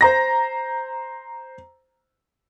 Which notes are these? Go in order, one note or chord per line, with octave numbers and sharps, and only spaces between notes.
C5 A#5 A#6